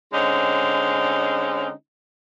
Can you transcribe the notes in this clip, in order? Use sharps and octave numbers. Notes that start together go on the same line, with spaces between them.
D3 G#3 C4 C#4 D#4